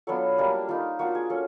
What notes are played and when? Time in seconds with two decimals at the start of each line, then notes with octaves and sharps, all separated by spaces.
0.07 F#3 B3 D4 F4 A4
0.38 G3 A#3 D4
0.69 A#3 D#4 F4
0.99 A#3 D4 F4 F#4
1.15 G#4
1.30 C#4 A4